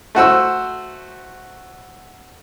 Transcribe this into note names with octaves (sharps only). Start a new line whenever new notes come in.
A3 F#4 C5 E6